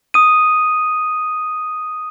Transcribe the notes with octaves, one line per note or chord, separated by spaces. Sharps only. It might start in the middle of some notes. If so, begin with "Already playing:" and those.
D#6 D#7